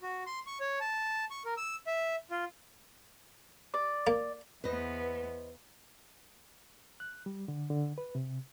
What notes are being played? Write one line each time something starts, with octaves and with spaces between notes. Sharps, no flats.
F#4
C6
C#6
C#5
A5
C#6
A#4
E6
E5
F4
D5
A#3
E2 B3 B4 C5 D#5
F#6
G3
D3
D3
B4
C3